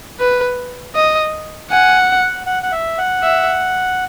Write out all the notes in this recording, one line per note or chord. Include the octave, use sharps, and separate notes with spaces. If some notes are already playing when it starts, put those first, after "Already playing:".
B4
D#5
F#5 G#5
F#5
F#5
F#5
E5
F#5
E5